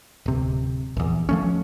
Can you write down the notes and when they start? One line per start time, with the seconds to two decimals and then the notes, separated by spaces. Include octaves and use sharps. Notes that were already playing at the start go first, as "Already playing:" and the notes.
0.26 D1 C3
0.97 A#1 E2
1.29 F3 A3 C#4